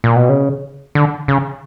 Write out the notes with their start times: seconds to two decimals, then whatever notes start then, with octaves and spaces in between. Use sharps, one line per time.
0.04 A#2
0.16 B2
0.29 C#3
0.95 D3
1.28 C#3